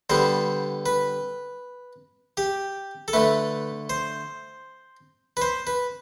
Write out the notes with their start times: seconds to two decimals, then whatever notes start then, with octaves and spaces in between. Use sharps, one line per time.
0.10 D3 G3 B3 C5
0.86 B4
2.37 G4
3.08 A4
3.13 D3 A3 B4
3.90 C5
5.37 B4
5.41 C5
5.67 B4